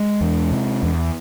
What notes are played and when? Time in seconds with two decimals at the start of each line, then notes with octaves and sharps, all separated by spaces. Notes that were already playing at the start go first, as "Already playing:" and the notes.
Already playing: G#3
0.21 E2
0.51 C3
0.83 E2